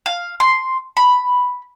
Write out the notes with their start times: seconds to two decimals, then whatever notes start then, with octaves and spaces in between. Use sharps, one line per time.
0.06 F5
0.40 C6
0.97 B5